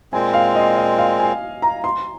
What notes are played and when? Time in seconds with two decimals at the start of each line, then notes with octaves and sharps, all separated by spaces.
0.13 A#2 G#3 C4 G#5
0.33 F5
0.55 D#5
0.77 D#5
0.98 F5
1.20 G#5
1.62 A#5
1.84 C6